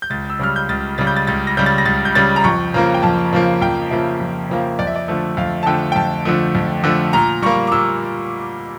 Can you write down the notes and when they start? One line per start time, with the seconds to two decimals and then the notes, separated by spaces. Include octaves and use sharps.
0.02 G6
0.10 C#2 A6
0.30 E6
0.39 C#3 G3 F6
0.56 G6
0.69 C#2 A6
0.98 C#3 G3 A6
1.07 G6
1.16 A6
1.27 C#2 A6
1.47 A#6
1.57 C#3 G3 G6
1.66 A6
1.78 A#6
1.86 C#2 A6
2.05 G6
2.15 C#3 G3 A6
2.36 A#5
2.44 F2 C#6
2.74 C#3 F3 A#3 A#5
2.94 G5
3.03 F2 A5
3.33 C#3 F3 A#3
3.61 F2 G5
3.90 C#3 F3 A#3 E5
4.20 F2
4.50 C#3 F3 A#3
4.79 F2 D5
4.87 E5
4.96 D5
5.08 D3 F3 A3
5.37 F2 F5
5.63 A5
5.66 D3 F3 A3 G5
5.92 G5
5.96 F2 A5
6.25 D3 F3 A3
6.55 F2
6.84 D3 F3 A3
7.13 A#2 A#5
7.42 G3 A#3 C#6
7.67 D6
7.72 A#2 E6